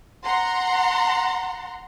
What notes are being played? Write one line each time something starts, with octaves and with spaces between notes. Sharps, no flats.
F#5 A#5 C6